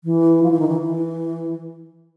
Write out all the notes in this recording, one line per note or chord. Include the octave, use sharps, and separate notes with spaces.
E3
F3
E3
D#3
E3
E3